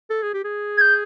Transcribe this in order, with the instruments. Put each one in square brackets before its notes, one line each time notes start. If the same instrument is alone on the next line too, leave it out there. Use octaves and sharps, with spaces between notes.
[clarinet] A4
G#4
G4
G#4
[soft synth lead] G#6
G6